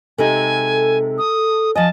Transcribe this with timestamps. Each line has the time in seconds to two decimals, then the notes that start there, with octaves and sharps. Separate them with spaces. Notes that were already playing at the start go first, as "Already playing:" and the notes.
0.18 C3 G#3 D#4 A4 G#5
1.18 D#6
1.76 F3 D#5 G#5 A5